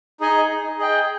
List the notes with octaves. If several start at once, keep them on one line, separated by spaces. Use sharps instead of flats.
D#4 G#4 D#5 G#5
G#4 D#5 G5